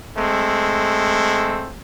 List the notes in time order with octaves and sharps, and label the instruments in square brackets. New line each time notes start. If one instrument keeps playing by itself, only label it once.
[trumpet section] G#3 A3 C4